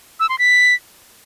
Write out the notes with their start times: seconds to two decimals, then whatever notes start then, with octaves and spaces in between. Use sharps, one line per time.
0.20 E6
0.29 C6
0.39 B6